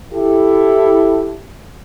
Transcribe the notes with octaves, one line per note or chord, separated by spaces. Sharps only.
E4 G4 A4